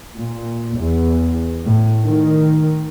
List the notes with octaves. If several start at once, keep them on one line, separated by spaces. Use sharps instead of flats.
A#2
E2
A2
D#3